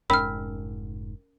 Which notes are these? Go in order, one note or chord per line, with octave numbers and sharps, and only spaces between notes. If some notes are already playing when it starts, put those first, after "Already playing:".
F1 G#2 C#4 A#4 B5 F6 B6